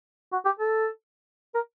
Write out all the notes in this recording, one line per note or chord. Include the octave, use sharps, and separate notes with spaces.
F#4
G4
A4
A#4